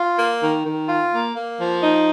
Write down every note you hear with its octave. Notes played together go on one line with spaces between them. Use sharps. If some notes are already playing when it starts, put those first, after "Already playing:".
Already playing: F4
A#3
D#3
D#3
F4
A#3
A#3
F3
D#4